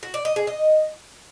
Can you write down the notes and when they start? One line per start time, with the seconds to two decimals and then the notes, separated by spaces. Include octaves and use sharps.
0.03 F#4
0.14 D5
0.25 D#5
0.36 G#4
0.47 D#5